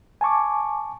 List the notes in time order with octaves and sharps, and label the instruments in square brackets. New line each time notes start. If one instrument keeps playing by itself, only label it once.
[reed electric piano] G#5 A5 C#6 D6